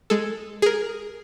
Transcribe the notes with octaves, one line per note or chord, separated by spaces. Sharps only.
G#3 A4
G#4 A#4